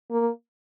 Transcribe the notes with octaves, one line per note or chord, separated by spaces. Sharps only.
A#3